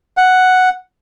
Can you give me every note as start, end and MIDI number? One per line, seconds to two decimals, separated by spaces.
0.17 0.69 78